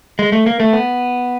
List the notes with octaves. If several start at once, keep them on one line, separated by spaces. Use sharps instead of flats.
G#3
A3
A#3
A3
B3